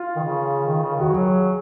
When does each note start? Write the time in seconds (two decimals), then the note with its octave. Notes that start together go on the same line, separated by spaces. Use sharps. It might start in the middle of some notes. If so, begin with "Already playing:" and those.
Already playing: F4
0.16 D#3
0.22 C#3
0.66 D#3
0.81 C#3
0.96 D#3 F#4
1.11 F#3 G#4